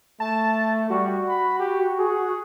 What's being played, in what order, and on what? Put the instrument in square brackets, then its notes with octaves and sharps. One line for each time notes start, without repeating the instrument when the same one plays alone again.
[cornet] A3 [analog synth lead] A5
[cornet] G3 [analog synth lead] F#4
[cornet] B5
G4
G#4